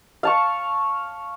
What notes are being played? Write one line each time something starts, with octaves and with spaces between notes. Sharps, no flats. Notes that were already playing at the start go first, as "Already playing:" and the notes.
F5 A5 C#6